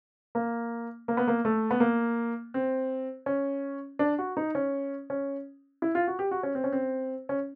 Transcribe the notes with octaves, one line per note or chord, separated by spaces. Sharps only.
A#3
A#3
B3
A#3
A3
B3
A#3
C4
C#4
D4
F#4
D#4
C#4
C#4
E4
F4
F#4
G4
F#4
C#4
C4
C#4
C4
C#4